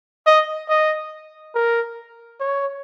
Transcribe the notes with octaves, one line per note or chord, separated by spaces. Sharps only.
D#5
D#5
A#4
C#5